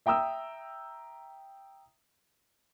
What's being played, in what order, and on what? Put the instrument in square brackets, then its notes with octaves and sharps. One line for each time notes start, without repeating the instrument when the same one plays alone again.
[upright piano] E5 G5 A#5 D#6 E6